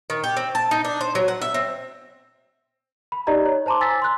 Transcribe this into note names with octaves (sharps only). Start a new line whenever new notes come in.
D#3
G4
C4
A5
D#4
D4
C5
F#3
F#5
E5
C4
B5
D#4 G4 D5 D#5 A#5
C#5
C5 A5 A#5 C6 D6
G#5 E6 A6 B6
C6 F#6